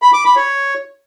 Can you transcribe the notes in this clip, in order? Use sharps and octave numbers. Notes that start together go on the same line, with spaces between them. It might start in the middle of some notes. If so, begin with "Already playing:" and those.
B5
D6
B5
C#5